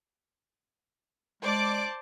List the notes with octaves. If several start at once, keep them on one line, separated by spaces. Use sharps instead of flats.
G#3 C5 D5 A5 D6